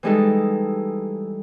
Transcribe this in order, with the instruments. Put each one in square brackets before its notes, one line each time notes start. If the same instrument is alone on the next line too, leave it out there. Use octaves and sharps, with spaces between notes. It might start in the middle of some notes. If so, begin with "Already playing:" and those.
[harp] E3 G3 G#3 D#4 A4